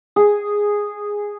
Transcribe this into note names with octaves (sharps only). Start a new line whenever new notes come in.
G#4